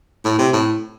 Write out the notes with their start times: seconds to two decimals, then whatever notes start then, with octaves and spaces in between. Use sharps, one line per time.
0.25 A2
0.39 C3
0.53 A2